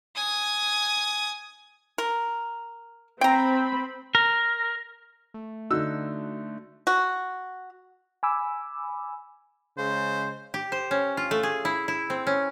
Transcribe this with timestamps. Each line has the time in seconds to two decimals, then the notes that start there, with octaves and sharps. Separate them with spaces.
0.16 G#5 D#6
1.98 A#4
3.21 C4 G5 A#5 B5
4.15 A#4
5.34 A3
5.71 D3 D#4 F#4 E6
6.87 F#4
8.23 G#5 B5 D6 E6
9.78 C#3 G#3 C5
10.54 G4
10.72 C5
10.91 C#4
11.17 F4
11.31 A3
11.43 G#4
11.65 E4
11.88 E4
12.10 C4
12.27 C#4